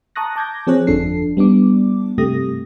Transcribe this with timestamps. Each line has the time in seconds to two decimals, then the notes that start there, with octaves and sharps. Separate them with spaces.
0.16 A5 A#5 C#6 D#6 F#6 A#6
0.36 A5 D6 G6 G#6 A#6
0.67 F3 C4 G#4 C#5 F#6
0.87 G1 F2 F3 D4 A4 C7
1.37 G3 B3 D4 D6
2.18 G2 C3 A3 G4 D#6 A#6